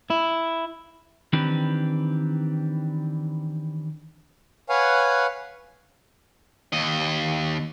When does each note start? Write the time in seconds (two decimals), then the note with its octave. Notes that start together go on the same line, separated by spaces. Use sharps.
0.10 E4
1.33 D#3 E3 C4 D4 G4 B4
4.69 B4 C#5 F5 F#5 G#5
6.73 D#2 D#5